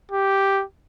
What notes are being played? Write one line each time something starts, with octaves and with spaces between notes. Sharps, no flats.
G4